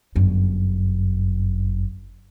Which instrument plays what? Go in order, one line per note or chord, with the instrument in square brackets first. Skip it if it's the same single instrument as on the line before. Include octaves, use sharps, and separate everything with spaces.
[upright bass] G1 F#2